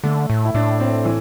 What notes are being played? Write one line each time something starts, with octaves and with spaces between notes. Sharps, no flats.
D3 A3
A2
E4
A2 D4
C4
E3